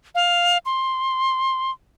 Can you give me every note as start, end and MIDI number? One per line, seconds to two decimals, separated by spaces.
0.15 0.58 77
0.66 1.71 84